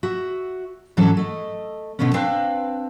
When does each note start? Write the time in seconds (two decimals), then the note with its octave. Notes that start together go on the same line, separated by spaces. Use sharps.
0.03 F#4 E5
0.97 G#2 E3 F#3 C#4 E4 A4
1.17 A3 D#5
1.99 B2 D3 A3 B3 C#4
2.14 C4 D4 B4 F5